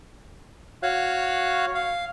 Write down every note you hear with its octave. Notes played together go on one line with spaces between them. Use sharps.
F#4 C#5 F5 F#6
F5